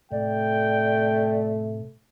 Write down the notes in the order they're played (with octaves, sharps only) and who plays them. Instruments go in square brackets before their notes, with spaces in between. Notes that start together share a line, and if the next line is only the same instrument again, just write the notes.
[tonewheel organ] A2 C3 [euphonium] A3 [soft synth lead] D5 [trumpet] G5